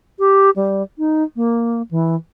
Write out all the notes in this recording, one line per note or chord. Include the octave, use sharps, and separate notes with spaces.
G4
G3
D#4
A#3
E3